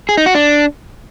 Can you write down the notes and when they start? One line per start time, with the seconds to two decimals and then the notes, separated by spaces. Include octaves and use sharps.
0.09 G#4
0.17 D#4
0.26 F#4
0.35 D4